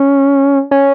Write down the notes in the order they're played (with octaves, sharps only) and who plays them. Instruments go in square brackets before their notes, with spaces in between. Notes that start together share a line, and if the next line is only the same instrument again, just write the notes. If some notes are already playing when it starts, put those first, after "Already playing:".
Already playing: [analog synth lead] C#4
C#4